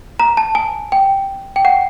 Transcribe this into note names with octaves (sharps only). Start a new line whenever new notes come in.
A#5
A5
G#5
G5
G5
F#5